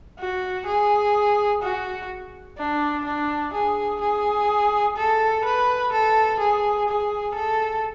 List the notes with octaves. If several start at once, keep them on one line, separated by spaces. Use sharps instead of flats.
F#4
G#4
F#4
D4
D4
G#4
G#4
A4
B4
A4
G#4
G#4
A4